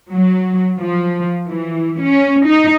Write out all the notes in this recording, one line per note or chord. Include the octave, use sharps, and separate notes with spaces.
F#3
F3
E3
C#4
D#4